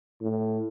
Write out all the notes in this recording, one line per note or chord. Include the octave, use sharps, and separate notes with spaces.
A2